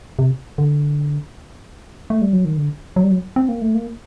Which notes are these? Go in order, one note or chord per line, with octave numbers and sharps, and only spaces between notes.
C3
D3
A3
G3
F#3
D#3
D3
F#3
G3
F#3
C4
A#3
A3
A#3